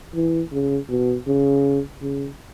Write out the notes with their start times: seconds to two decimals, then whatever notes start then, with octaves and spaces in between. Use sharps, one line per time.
0.15 E3
0.52 C#3
0.90 B2
1.27 C#3
2.02 C#3